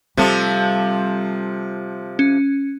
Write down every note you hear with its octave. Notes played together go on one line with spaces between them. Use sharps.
C3 F3 G3 A4
C#4